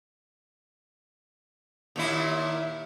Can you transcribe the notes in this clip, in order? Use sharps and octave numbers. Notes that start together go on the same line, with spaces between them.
D#2 A#2 E4